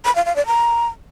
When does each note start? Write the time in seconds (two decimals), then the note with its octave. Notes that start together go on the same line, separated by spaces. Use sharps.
0.05 B5
0.15 F5
0.26 F5
0.36 D5
0.46 A#5